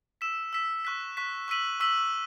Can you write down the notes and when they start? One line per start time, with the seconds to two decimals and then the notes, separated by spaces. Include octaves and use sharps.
0.21 E6 B6 E7
0.53 E6 B6 E7
0.85 C#6 F#6 B6
1.17 C#6 F#6 B6
1.48 C#6 E6 B6 D#7 F#7
1.80 C#6 E6 B6 D#7 F#7